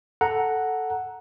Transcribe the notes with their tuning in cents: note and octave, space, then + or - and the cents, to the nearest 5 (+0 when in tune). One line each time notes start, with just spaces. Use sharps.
A4 +0 F#5 +0 A#5 +0